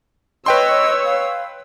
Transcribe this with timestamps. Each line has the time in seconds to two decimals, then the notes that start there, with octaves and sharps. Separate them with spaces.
0.46 B4 C#5 D#5 G5 C6 E6
1.05 F5